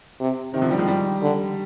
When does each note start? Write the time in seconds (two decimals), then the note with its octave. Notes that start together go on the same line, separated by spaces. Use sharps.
0.20 C3
0.53 C3 D#3
0.62 D3 F3
0.71 D#3 G3
0.79 F3 G#3
0.88 D#3 G3
1.22 D3